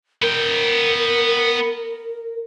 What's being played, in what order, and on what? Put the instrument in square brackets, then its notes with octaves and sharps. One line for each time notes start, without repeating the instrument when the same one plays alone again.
[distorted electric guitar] B3 G5 [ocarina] A#4